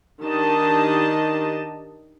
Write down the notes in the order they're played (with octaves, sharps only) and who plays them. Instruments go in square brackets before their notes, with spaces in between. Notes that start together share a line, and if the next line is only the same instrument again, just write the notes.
[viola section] D#3 D4 G4 D#5 A5